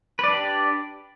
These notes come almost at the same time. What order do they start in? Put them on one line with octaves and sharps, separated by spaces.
B4 D5 D4 G4